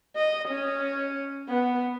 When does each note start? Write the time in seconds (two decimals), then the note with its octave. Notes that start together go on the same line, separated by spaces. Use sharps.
0.16 D#5
0.48 C#4
1.49 B3